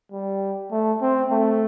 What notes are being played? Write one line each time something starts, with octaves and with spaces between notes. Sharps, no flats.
G3
A3
C4
A3